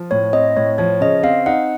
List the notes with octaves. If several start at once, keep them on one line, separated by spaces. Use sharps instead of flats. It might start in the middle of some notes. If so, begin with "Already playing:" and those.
Already playing: F3
A2 C#5
C4 D#5
A2 C#5
F3 C#5
C#3 D#5
C4 F5
D#4 F#5